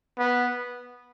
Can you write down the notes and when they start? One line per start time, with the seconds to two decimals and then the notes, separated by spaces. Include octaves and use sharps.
0.19 B3